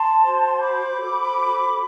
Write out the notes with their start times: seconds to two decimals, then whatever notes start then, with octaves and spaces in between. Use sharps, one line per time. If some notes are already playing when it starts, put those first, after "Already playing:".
Already playing: A5 C6
0.22 F#4 C5
0.60 B5 D6
0.99 F#4 A4 C5